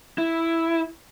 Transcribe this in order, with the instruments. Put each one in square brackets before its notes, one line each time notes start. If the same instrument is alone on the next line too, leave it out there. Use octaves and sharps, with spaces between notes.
[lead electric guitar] E4